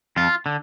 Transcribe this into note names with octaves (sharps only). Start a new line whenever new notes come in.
F2 F4
D3